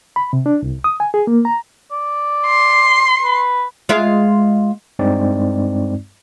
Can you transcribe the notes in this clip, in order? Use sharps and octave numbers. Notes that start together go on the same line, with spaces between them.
B5
C3
D4
C2
D#6
G#5
G#4
A#3
A#5
D5
C6
B4
G#3 F4 E5
G2 G#3 C4 D#4 D5